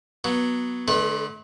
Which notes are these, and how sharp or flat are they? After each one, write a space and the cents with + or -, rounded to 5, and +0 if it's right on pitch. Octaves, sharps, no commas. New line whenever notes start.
F#3 +0 B3 -15
D3 +0 A3 -45 B4 -20